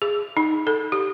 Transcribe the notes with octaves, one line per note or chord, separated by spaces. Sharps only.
G#4
D#4
A4
G4